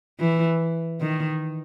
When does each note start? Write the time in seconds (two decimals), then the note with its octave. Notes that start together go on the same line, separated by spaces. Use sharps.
0.20 E3
1.01 D#3